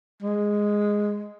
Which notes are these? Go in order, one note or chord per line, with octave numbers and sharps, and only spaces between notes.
G#3